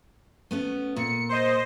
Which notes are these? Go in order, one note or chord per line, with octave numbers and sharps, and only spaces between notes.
A3 B3 C#4
A#2 C#7
C5 D#5